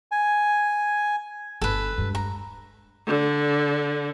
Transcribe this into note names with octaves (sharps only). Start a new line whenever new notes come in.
G#5
G1 A4 B4
G2 G#3
A#5
D3